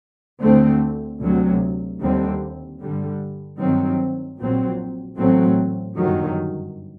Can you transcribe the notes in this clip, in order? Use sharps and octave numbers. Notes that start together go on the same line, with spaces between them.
D2 D3 A3 C4
D2 C3 F#3
D#2 D3 G3 C4
G2 D3 G3
G2 D#3 F#3 C4
A#1 A#2 F#3 C4
A1 A2 F#3 A3 C4
G1 F#2 D#3 F#3